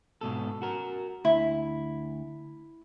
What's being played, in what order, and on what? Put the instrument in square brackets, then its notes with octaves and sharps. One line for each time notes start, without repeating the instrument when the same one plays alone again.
[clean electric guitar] G#2 B2 A4
F#4 A#4
[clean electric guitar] D2 [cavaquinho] E4